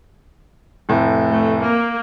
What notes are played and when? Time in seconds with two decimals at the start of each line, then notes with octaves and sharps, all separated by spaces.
0.89 F1 A2
1.30 A3
1.61 A#3